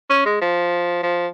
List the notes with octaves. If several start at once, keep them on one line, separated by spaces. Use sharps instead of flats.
C#4
G#3
F3
F3